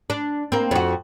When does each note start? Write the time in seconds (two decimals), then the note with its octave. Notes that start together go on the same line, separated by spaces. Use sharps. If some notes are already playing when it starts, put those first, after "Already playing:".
0.10 D4
0.52 A#3 C4
0.71 F2 F#4